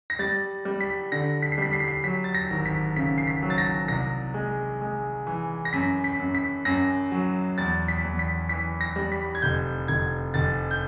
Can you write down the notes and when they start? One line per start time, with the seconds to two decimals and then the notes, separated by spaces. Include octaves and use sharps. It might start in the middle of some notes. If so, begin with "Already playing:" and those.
0.10 A#6
0.19 G3 A6
0.65 G3
0.81 B6
1.12 D3 A#6
1.42 B6
1.52 C7
1.58 G3 B6
1.73 C7
1.80 B6
1.88 C7
2.04 F#3 B6
2.24 A6
2.34 A#6
2.50 G#1
2.65 B6
2.96 C#3 B6
3.18 C7
3.27 B6
3.42 F#3
3.50 A6
3.58 A#6
3.88 C2 A#6
4.34 G#3
4.81 G#3
5.27 E3
5.65 A#6
5.73 F#2 B6
6.04 B6
6.19 F#2
6.35 B6
6.65 F#2 A#6
7.12 F#3
7.58 E2 A6
7.88 B6
8.04 E2
8.19 B6
8.49 E3 B6
8.81 A#6
8.96 G3
9.12 B6
9.35 G#6
9.42 F1 G6
9.88 F1 G#6
10.34 F1 A6
10.71 G6